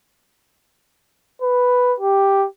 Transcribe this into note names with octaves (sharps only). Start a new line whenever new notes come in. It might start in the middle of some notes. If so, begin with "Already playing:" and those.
B4
G4